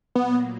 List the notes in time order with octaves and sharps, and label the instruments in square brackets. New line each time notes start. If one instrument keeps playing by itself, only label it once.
[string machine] A#2 F#3 A#3 [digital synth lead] B3